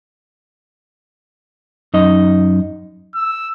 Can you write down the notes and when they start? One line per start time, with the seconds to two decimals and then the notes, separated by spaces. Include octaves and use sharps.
1.94 F#2 D#4 D#5
3.15 E6